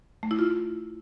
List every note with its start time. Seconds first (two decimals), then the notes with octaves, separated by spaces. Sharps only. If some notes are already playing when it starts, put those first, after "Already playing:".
0.23 A3
0.31 E4
0.39 F4